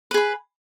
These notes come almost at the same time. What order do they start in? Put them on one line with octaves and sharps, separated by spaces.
B4 G#4 B5